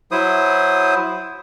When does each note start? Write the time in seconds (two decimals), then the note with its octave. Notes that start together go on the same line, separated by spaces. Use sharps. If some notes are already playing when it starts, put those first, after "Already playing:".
0.12 F#3 E4 C5 D#6